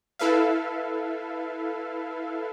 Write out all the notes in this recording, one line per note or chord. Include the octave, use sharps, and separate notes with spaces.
E4 A4 B4 E5 F5